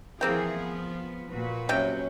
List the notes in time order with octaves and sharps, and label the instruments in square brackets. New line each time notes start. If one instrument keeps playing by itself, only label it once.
[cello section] E3 G#4 [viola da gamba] F3 [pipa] A#3 C4 G5
[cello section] B3
A#2 F#4 B4
[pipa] C3 G5 [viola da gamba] F#3 C#4